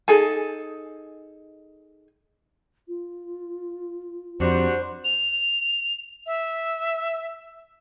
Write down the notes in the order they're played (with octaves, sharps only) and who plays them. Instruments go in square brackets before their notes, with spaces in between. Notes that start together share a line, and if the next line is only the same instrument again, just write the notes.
[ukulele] D#4 G#4 A4 G#5
[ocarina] F4
[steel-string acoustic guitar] F2 [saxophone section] G3 D4 F#4 [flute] C5
[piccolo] F7
E5